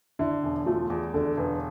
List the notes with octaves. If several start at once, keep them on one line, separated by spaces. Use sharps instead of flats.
D3 E4
E1
A3 F4
E2
D3 A4
E1 B4